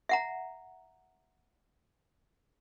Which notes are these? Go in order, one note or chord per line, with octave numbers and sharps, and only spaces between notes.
E5 F#5 A#5